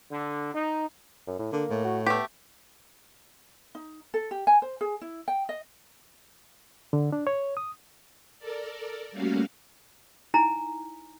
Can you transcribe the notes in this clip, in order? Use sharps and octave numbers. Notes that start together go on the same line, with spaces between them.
D3
D#4
F#2
A2
D3 A#3
A2
F#4
A3 B3 G4
D#4
A4
G4
G#5
C5
G#4
E4
G5
D#5
D3
D4
C#5
D#6
A4 A#4 D5
G3 A3 A#3 C#4 F#4 F5
D#4 E4 G#5 A#5